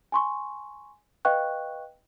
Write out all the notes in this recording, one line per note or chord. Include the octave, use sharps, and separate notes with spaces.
G#5 C6 C#6
B4 D#5 F5 G5 C#6 F#6